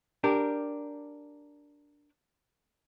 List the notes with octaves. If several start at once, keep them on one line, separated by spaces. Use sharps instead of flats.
D4 G4 A#4